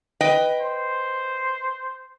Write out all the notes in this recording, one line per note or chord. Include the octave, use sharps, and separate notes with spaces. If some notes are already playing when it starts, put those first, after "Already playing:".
B4 D#5 G5
C5